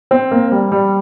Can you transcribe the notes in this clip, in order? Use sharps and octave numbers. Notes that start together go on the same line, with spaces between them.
C4
A#3
G3
G3